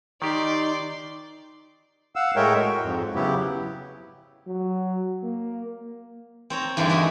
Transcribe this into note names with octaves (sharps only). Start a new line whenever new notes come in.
D#3 D#4 G4 D5 C6
F5 F#5 E6
A2 G#3 A#4 C#5 E5 G5
F#4
F2 G#2
C#3 F#3 B3 E4 G4
F#3
A#3
C4 C#5 A#5
E2 G2 D3 D#3 E4 A#5
F#4 D#5 E5 G#5